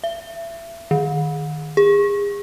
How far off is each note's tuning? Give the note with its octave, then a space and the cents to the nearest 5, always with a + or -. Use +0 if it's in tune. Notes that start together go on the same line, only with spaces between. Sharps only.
E5 +30
D#3 -20
G#4 -35